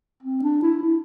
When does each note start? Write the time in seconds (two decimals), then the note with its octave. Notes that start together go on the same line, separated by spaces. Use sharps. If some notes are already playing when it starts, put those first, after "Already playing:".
0.23 C4
0.43 D4
0.62 E4
0.82 E4